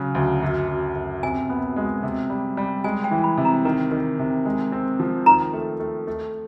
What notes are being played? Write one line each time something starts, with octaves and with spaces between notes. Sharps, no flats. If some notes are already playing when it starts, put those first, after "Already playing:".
Already playing: C#3 F#3
D2
F#2
F#2
F#2
C3 G#5
B3
G#3
C3
G3
G3
G#3 G#5
G5
E3
B5
C3
A#5
D#3 A#5
D#3
C3
G#3
C4
F3
D#3 A#5
A3
A3
A3